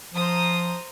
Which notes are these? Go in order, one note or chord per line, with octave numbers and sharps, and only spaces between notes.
F3 C5 A#5 D#6